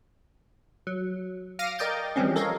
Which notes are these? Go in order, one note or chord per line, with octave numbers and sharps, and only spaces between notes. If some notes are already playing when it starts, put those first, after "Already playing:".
F#3
F5 D6 F6 A#6 C#7 D#7
A#4 D5 D#5 G5 G6 A6
E3 F3 G3 G#3 C4 C#4
A4 A#4 C#5 D#5 F5